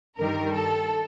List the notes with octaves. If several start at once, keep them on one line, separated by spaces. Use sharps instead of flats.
G2 D#3 G3 A#4
A4